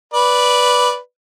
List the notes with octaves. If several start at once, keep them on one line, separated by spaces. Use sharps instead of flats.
B4 D5